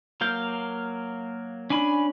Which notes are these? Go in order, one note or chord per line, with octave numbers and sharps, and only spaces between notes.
F#3 A#3 F5 G6
C#4 D4 G#5 B5